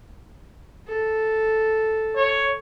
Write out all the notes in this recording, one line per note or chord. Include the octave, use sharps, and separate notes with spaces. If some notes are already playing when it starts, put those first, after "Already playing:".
A4
C#5